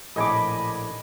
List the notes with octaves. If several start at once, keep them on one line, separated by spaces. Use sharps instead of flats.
A#1 A2 A4 D#5 G#5 B5 D6